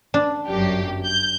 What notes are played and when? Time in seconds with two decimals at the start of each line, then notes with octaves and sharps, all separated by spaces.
0.14 D4
0.48 G1 F#2 G4
1.04 G6